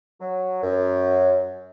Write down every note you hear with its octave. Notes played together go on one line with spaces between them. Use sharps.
F#3
F#2